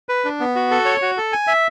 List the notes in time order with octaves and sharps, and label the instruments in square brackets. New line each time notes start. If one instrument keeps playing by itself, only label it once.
[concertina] B4
D4
B3
F#4
A4
C#5
F#4
A4
G#5
E5